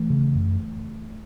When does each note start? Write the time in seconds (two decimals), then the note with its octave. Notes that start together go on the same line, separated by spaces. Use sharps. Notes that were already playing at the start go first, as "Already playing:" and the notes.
Already playing: E3 A3
0.10 C#3
0.35 F#2